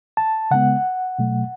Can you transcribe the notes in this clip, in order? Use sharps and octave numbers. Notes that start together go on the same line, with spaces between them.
A5
C#3 G#3 B3 F#5
B2 F#3 A3